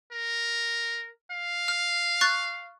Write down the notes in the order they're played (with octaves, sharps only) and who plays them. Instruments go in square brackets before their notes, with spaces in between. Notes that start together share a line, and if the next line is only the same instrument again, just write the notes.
[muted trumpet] A#4
F5
[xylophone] F6
C#6 F#6 A6